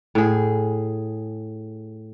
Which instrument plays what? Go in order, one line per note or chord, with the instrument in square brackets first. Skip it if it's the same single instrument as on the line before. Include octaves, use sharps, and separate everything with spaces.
[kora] A2 G#4